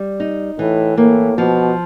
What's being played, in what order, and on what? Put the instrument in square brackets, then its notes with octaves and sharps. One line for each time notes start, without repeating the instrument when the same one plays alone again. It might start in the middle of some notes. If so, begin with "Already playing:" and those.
Already playing: [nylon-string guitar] G3
D#4
[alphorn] A2 [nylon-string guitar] E3
[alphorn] A2 [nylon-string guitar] A#3
[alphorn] B2 [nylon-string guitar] F3